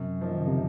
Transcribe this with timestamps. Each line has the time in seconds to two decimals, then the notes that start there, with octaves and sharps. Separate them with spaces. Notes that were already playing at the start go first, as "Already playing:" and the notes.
Already playing: F#2 C3
0.21 F3 A#3 D#4
0.32 D#3
0.40 C#3
0.48 C3